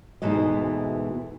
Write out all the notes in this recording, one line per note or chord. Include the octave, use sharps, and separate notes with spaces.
D2 G#2 B2 E3 D#5